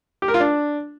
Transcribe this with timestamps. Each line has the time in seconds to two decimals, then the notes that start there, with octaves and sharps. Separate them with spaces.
0.22 G4
0.28 A#4
0.34 F4
0.40 D4